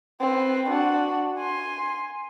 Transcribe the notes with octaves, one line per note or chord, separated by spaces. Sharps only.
C4 B4
D4 F#4
G#5 C6